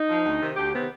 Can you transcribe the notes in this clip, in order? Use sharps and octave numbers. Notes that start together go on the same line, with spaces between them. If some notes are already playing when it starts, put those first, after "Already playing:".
Already playing: D#4
F3
D2
C3 D#3
D2 G4
C3 D#3 B3